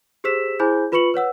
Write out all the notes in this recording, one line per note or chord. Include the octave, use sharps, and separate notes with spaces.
G4 G#4 C5 E6 B6 E7
E4 G#4 C5 G#5 B5 G6
F4 B4 B5 C#6 C#7 F#7
B4 C#5 F#5 E6